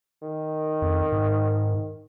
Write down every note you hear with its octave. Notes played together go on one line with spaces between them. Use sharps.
D#3
F2
G#2